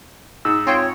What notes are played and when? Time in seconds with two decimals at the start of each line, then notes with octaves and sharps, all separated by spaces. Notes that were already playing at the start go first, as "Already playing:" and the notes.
0.45 G#2 E6
0.67 C4 F4 C#5 G5